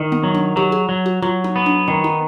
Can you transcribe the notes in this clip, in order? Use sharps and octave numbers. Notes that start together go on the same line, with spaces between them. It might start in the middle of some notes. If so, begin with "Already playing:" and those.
Already playing: D#3
B3
F#3
D4
F#3 G4
G#4
F#3
F#4
F#3 F4
D#4
B3
D4
D#3 C#4
D#4